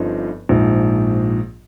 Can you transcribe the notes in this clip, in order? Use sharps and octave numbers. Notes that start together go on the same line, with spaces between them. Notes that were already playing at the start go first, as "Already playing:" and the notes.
Already playing: G1 G2 F3 C4 D#4
A#1 G#2 F3